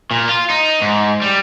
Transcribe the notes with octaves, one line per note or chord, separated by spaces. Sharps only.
A#2
F4
D#4
G#2
G3